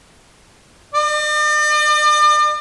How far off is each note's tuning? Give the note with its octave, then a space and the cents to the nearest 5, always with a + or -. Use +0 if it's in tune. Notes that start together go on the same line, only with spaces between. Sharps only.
D5 +45